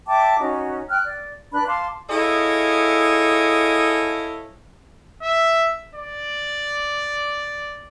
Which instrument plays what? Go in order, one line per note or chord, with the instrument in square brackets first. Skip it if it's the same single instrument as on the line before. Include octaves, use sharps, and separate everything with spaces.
[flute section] E5 G5 A5 D6
C#4 D#4 F#4
G5 F6 F#6
D5
D4 B4 B5 F#6
F5 A5 C6 D6
[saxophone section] E4 G#4 A4 C#5 D#5 F5
[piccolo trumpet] E5
D5